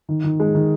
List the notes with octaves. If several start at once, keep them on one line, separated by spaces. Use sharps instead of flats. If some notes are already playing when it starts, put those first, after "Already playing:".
D#3
D#3
G#3
D#3